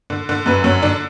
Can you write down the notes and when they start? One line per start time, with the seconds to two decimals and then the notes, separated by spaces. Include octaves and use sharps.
0.10 D3
0.29 D3
0.46 F#2 B4
0.64 F#2 C#5
0.82 D3 D4